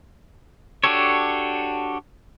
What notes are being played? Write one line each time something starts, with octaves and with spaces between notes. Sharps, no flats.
D4 F#4 G4 A4 C#5